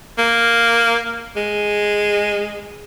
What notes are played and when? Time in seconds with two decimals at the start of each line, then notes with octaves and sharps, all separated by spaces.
0.18 A#3
1.36 G#3